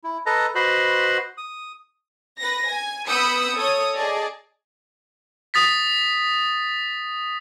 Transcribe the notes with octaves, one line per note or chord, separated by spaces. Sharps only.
E4
A4 B4 D#5 A5 A#5
F#4 B4 C5 D#5 B5 C6
D#6
B4 A#6
G#5
B3 B5 D#6 E6 G6 C#7
A4 C#5 D#6
G#4 D5 D#5 A5
D#6 A6 B6